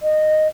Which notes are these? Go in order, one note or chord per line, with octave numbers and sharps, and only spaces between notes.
D#5